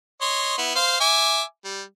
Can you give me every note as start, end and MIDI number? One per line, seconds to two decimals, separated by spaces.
0.21 0.56 73
0.21 0.56 75
0.21 0.56 84
0.58 0.74 59
0.58 0.74 64
0.75 0.96 72
0.75 0.96 77
1.00 1.42 76
1.00 1.42 80
1.00 1.42 86
1.65 1.82 55